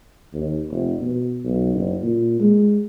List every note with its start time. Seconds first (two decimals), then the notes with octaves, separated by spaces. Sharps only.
0.33 D#2
0.71 F1
1.00 B2
1.44 B1
1.74 F#1
2.02 A#2
2.40 G#3